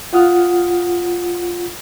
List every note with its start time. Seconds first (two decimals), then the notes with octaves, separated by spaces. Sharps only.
0.13 F4 F#5 D#6 F6